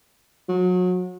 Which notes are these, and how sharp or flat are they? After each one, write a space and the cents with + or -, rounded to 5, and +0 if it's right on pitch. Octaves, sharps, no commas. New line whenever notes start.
F#3 -30